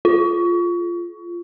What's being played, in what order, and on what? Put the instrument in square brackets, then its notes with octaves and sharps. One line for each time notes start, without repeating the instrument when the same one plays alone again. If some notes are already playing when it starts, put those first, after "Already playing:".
[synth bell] F4